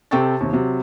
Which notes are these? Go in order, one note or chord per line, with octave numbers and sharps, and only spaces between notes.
C3 A4 G5 A5 C#6 A6
D#2 C3
C3 F#3